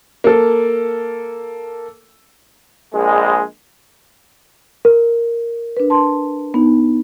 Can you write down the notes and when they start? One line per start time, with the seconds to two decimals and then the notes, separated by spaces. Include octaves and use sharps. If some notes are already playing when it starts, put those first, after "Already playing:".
0.24 A#3 A4
2.94 A#1 G#3
4.85 A#4
5.77 D4 B4
5.90 A5 C6
6.54 B3 D#4